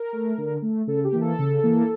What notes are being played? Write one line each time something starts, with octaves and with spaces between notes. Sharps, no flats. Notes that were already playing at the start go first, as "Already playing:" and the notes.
Already playing: A#4
A3
D3
A3
C#3 A4
G4
E3 A#3
A4
C#3
E3 A#3